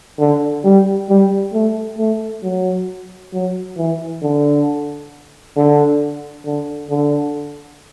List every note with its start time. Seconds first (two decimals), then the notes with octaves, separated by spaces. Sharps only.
0.19 D3
0.64 G3
1.09 G3
1.53 A3
1.98 A3
2.43 F#3
3.33 F#3
3.77 E3
4.22 D3
5.56 D3
6.45 D3
6.90 D3